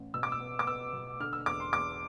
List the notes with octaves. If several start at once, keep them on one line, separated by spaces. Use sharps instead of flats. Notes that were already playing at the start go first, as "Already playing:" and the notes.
Already playing: A1
B2 E6
D6
E6
B3
D6
B3 E6
B2
D3 F6
E6
E2 D6
C6
E2 D6